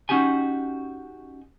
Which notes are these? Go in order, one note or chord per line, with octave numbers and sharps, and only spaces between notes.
C#4 D#4 F#4 G4 G#5